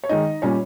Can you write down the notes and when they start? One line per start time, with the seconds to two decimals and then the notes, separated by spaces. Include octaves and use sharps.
0.04 C#5
0.09 D#3 G#3 D#4 D#5
0.42 A#2 G3 C#4 C#5